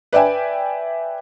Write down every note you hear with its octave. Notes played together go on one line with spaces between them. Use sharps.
B4 D5 E5 G5 G#5